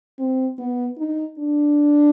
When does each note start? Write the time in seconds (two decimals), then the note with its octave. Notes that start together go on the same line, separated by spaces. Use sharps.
0.19 C4
0.58 B3
0.98 D#4
1.39 D4